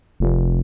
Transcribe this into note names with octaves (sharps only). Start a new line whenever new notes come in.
F1